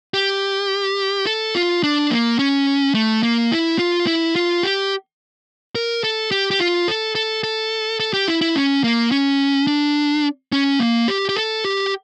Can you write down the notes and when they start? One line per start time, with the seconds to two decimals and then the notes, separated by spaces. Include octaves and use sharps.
0.14 G4
1.27 A4
1.55 F4
1.83 D4
2.10 A#3
2.39 C#4
2.94 A3
3.23 A#3
3.52 E4
3.79 F4
4.07 E4
4.36 F4
4.63 G4
5.75 A#4
6.04 A4
6.31 G4
6.51 G4
6.60 F4
6.88 A4
7.15 A4
7.44 A4
8.00 A4
8.13 G4
8.28 E4
8.41 E4
8.56 C#4
8.84 A#3
9.11 C#4
9.67 D4
10.52 C#4
10.79 A#3
11.08 G4
11.29 G4
11.36 A4
11.65 G4